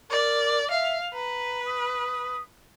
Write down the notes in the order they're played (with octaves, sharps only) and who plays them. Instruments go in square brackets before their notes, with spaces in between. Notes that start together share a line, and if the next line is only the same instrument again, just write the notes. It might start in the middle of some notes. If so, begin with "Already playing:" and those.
[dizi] A#4 [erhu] D5
[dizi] E5 [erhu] F5
[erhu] B4 [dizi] A#5
[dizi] D#6